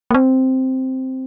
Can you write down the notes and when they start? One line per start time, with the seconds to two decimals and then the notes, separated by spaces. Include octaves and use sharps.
0.11 A#3
0.14 C4